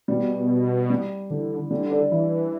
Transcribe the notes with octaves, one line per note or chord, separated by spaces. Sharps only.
B2 G3
G3
D3 E3
D3 G3
D4
E3 E4